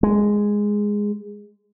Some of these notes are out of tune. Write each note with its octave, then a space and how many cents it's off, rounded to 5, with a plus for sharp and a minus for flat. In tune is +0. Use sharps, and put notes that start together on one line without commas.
G#3 -5